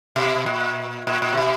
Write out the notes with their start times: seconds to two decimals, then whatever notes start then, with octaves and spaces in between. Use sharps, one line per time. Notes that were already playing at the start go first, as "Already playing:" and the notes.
0.16 B2
0.46 A#2
1.07 A#2
1.22 A#2
1.33 C3
1.37 B2